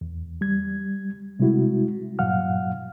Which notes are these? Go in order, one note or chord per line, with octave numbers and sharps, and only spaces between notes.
E2
G3 G#6
C3 G3 G#3 E4 F#4
G2 A#2 F#3 F5 F#5 F6